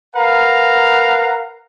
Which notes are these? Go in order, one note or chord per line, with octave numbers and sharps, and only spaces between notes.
A#4 B4 F5 F#5 A#5